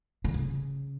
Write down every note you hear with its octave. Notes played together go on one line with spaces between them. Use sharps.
D3
C#3